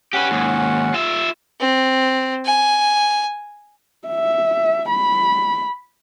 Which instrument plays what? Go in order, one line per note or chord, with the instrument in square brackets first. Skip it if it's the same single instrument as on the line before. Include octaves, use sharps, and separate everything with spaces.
[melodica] C#4 F#5 [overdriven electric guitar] G4 B4
[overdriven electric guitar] D#2 G#2
F4 E5
[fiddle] C4
G#5
[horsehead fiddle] E5
B5